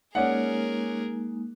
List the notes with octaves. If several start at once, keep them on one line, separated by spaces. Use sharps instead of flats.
G#3 A#3 C#4 D#4 G#4 A#4 D5 F#5